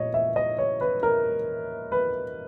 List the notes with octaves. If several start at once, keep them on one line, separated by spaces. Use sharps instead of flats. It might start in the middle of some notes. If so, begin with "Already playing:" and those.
Already playing: A#2 C#5 D#5
E5
D#5
C#5
B4
A#4
B4